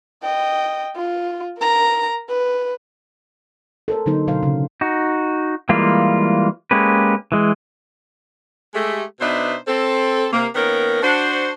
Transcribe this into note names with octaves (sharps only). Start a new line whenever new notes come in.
D#5 G5
F4
A#4 A#5
B4
A4 A#4 C5
D3 F#3 A#3 D#4 C5
B2 D3 F#3 C5 F5
C#3
D#4 F#4
E3 G3 G#3 A#3 F4
G#3 A#3 C#4 G4 B4
E3 G#3
G#3 A3 G4
B2 B3 D4 D#4 C5 E5
C4 A4
C3 A#3
D#3 A#3 B3 C#4 A#4
D4 F#4 C5